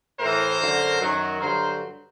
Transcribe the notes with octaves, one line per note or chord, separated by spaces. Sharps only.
A2 A#4 C5
E3
F#2 D3 F#3
F#2 D#3 F#3
G2 D3 F#3 A#4 C5